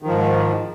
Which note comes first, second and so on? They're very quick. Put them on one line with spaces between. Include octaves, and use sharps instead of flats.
D#3 F3 G#2